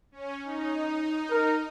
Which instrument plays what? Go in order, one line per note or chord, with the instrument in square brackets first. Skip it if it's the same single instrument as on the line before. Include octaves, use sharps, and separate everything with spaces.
[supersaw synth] C#4
D#4
[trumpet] A#4